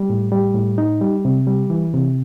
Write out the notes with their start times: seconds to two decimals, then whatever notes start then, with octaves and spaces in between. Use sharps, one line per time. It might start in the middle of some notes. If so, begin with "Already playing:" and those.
Already playing: G3
0.10 A2
0.32 G3
0.55 A2
0.78 D#4
1.01 G3
1.25 C3
1.47 G3
1.70 E3
1.93 C3